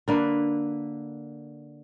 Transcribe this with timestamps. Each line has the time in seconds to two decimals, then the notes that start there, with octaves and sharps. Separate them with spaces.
0.08 D3 A#3 B4